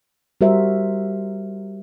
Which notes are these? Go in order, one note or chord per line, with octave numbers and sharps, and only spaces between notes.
G3 F#4 A#4 C5 E5